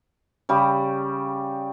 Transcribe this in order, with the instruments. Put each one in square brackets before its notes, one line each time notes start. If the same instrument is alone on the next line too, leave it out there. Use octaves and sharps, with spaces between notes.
[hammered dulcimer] C#3 G3